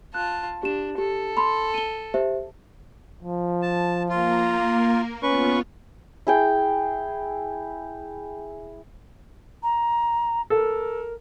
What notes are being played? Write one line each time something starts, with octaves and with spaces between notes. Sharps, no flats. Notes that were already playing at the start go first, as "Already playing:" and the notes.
F4 A5 F#6
D4 G4 E7
G4 A4
B5 C6
D#7 G7
G4 C5 E5
F3
A5
A#3 F4 A#4
B3 C#4 F4 B4 C#6
E4 G#4 G5
A#5
A4 A#4